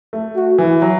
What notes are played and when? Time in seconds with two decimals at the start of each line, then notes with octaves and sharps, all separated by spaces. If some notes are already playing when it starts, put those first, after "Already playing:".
0.13 A3
0.35 F#4
0.58 E3
0.82 F#3